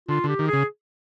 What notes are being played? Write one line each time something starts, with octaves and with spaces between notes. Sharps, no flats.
D3 F4
D3 G4
D#3
G#4
C#3